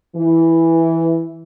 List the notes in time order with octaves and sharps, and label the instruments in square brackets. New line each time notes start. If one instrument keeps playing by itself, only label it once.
[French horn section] E3